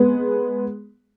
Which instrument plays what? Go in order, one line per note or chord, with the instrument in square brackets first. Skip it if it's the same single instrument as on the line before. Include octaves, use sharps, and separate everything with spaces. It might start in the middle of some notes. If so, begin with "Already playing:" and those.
Already playing: [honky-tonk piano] G#3 B3